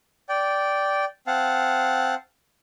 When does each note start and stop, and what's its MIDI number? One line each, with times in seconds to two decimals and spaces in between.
0.29 1.05 74
0.29 1.05 79
1.27 2.15 60
1.27 2.15 77
1.27 2.15 78
1.27 2.15 81